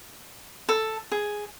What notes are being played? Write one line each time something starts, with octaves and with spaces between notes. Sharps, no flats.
A4
G#4